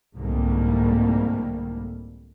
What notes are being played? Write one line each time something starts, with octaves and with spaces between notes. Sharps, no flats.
C2 G#2 D3 G3 A3 A#3